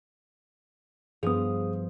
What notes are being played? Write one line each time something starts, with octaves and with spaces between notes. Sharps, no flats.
G2 F3 B3 G#4 D#6